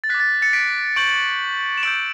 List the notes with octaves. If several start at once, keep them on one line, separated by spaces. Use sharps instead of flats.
A6
D6 F#6 B6
A6
A6 C#7
B6 D7
C#6 G6 D7 F#7
E7
C#6 E6 G6 D7 F#7